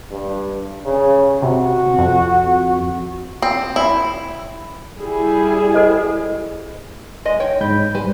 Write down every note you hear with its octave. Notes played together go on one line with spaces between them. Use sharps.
G2
C#3
C3 F#4
F2
C4
E4
G3 E4 G#4
A4 C5 D#5
G#3 D#5
C#5 G5
G#2 B5 G6
G3 B4 C5